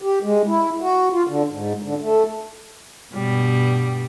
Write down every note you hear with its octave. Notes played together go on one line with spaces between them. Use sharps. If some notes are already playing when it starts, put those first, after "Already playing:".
G4
G#3
E4
F#4
F4
D3
G#2
D3
A3
G2 B2 G3